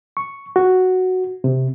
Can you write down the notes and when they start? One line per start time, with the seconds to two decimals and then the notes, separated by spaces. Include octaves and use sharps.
0.17 C#6
0.56 F#4
1.44 C3